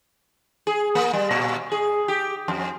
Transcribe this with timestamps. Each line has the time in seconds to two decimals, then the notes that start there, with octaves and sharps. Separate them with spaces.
0.67 G#4
0.95 A#3
1.13 G3
1.31 A#2
1.72 G#4
2.08 G4
2.48 F2